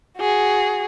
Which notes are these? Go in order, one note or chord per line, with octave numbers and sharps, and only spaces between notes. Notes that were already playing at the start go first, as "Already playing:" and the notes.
F#4 G#4